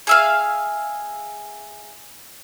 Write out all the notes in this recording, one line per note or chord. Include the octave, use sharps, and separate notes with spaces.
G#4 E5 F5